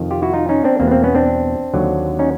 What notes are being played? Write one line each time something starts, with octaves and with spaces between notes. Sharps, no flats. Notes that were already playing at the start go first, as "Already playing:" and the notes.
Already playing: F2 C3 D#3
F4 G4
E4 F#4
D#4 F4
C#4 D#4
C4 D4
E2 B2 G3 A#3 C4
B3
A#3 C4
B3 C#4
C4 D4
D#2 D3 F#3
C#4 D#4